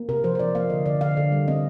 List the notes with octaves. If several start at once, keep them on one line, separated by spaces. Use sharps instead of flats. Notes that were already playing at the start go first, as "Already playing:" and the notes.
Already playing: A#3
C3 A#4
F3 C5
C5
F3 D5
A#3 F5
D3 D#5
D3 D5
D3 F5
D3 D5
G3
C4 D#5